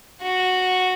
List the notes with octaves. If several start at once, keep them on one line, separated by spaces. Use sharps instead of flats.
F#4